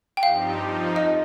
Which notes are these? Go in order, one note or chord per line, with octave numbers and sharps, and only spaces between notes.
G5
G2 F3 C4 D#4 G4 F5
F2 F3 D#4
D#5